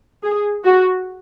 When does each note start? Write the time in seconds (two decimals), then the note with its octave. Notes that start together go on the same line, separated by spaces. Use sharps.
0.24 G#4
0.64 F#4